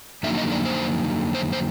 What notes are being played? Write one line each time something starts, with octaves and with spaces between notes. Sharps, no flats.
F2 D3 F#3 A#3 D#4 E5
D#5
D5
C5
C5
C5